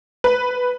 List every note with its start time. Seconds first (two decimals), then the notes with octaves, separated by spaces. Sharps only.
0.24 B4